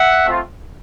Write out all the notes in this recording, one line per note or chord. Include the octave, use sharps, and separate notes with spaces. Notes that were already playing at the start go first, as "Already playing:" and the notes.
Already playing: E5 F#5
A3 C4 F4